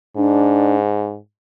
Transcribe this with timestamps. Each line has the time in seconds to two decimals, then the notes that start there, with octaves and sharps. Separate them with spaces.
0.16 G#2 D4